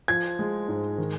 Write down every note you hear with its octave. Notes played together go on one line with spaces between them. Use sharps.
F3 G#6
G#3
G#2
D#3